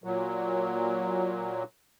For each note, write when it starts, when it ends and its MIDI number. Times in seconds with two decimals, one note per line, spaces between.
0.04 1.63 46
0.04 1.63 54